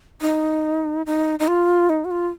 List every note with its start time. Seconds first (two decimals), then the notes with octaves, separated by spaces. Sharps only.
0.22 D#4
1.06 D#4
1.39 D#4
1.48 F4
1.90 D#4
2.05 F#4
2.11 F4